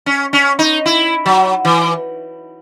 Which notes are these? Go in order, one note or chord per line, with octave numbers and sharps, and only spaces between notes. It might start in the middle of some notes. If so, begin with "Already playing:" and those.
C#4
C#4
D#4
E4
F#3
E3